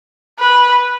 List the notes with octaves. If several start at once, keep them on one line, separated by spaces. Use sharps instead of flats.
B4